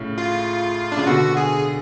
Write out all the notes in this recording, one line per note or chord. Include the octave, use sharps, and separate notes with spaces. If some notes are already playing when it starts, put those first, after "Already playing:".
Already playing: A2 C#3
F4
D4
C#3 F4
B2 D3 F#4
G#4